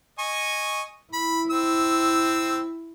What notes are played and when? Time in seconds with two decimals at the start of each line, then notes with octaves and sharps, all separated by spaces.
0.19 D#5 G#5 C#6
1.13 E4 B5
1.51 C4 E6